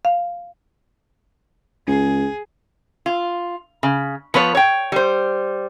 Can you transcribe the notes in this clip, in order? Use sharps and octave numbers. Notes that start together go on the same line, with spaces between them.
F5
C#2 G#4
F4
C#3
F3 B3 B4 C#5
C#5 G5
G3 C5